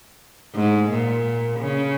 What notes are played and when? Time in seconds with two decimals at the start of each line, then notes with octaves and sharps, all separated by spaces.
0.55 G#2
0.90 A#2
1.59 C#3